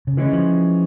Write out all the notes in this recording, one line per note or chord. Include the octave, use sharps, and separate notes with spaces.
C#3
D3 E3 G#3 C#4
F3